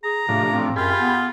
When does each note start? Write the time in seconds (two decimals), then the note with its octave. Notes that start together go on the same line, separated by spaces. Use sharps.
0.04 G#4 A#5
0.29 A2 C3 F3 D4
0.53 C4
0.76 F#2 F4 G4 G#4 B5
1.00 B3